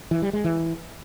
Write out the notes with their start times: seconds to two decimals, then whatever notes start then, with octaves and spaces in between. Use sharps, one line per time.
0.11 E3
0.22 G3
0.33 G#3
0.45 E3